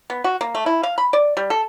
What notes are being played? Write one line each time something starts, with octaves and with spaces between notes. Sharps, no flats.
B3
F#4
A#3
A3
E4
F5
B5
D5
G3
A4